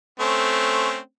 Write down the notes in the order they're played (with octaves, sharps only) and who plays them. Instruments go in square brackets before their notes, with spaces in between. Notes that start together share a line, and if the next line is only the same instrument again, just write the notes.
[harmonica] A3 C4 C#4